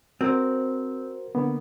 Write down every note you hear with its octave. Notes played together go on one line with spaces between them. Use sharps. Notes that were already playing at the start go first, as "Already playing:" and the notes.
C4 F#4 A#4 C5
D3 A#3 B3